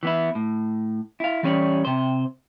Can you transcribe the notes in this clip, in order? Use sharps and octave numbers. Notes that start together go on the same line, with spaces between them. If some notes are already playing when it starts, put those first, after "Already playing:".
E3 B3 E4
A2
E4 F5
E3 G3 C#4 B4 C#5 D5
C3 C5